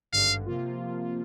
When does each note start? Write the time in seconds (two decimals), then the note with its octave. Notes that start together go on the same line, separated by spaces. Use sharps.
0.12 G#1 G2 D3 F5
0.46 C3 F3 A#3 F4